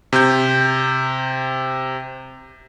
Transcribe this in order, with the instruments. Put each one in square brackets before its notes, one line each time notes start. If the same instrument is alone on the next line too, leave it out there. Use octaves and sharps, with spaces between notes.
[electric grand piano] C3 G6